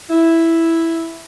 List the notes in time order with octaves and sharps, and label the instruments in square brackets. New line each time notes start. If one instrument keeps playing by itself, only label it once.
[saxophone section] E4